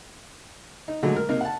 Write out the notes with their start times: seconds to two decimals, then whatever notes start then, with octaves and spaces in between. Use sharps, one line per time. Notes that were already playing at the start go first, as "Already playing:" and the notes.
0.88 D#4
1.02 A#2 D3 F#3 G#3 A3
1.16 A#4
1.29 C3 A#3 D#4 A#4
1.41 F#5 A5